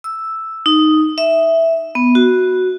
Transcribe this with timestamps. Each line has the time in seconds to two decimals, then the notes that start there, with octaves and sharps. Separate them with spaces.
0.04 E6
0.66 D#4
1.18 E5
1.95 B3
2.15 F#4